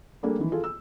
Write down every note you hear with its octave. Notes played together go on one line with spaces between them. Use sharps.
G3 A3 A#3 D4 G#4
D#3 E3
F4 G#4 A4
E6